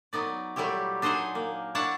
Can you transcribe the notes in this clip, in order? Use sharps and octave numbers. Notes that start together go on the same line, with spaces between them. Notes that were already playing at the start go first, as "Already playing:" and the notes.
F#3 B3 D#4 D5
A#2 F#3 G3 A3 E4 G4
D4 D#4 C5 D#5 F#5 G#5
A#3
D4 E4 C#5 F#5 A5